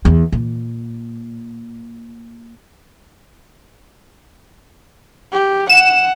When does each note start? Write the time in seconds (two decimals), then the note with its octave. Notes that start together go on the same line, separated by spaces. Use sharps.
0.05 E2
0.32 A#2
5.32 G4
5.70 F#5 E7